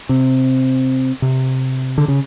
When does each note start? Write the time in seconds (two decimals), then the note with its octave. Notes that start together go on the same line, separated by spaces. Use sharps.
0.09 C3
1.22 C3
1.98 D3
2.08 C#3